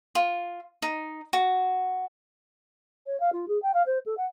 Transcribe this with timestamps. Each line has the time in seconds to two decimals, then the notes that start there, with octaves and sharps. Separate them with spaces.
0.15 F4
0.82 D#4
1.33 F#4
3.06 C#5
3.20 F5
3.33 F4
3.48 G#4
3.62 G5
3.74 F5
3.86 C5
4.06 A4
4.17 F#5